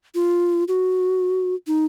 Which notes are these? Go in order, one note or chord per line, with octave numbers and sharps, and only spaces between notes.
F4
F#4
D#4